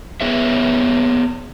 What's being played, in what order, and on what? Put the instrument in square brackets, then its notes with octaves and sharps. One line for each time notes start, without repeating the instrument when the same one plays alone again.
[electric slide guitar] B3 G#4 C#5 E5